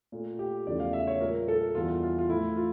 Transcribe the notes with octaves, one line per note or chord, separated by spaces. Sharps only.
A#2 A3
G4
E2 C#3 F3 A3 D5
F5
E5
C#5
A#2 G3 A#4
A4
E2 E3 G3 F4
F4
F4
A2 F3 A3 E4
F4